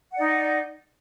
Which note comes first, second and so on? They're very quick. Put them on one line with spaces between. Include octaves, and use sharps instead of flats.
F#5 D5 D#4